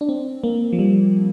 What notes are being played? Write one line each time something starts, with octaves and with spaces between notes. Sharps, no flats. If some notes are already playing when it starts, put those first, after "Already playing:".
D4
C4
A#3
F3
G3